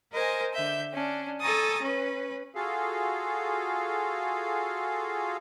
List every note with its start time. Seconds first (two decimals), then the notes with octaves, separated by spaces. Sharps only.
0.12 A#4 C5 D#5 G#5
0.53 D3 E5 G6
0.93 C#4 D4
1.40 A4 G#5 A#5 C#6 D#6 A6
1.81 C#4 B4
2.55 F4 F#4 G#4 A4 F5